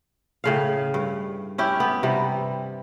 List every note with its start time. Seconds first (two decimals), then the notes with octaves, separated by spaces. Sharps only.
0.44 A2 C#3 F5
0.94 G2
1.58 C#4 E4 G4
1.80 B3
2.03 C3 E3 G3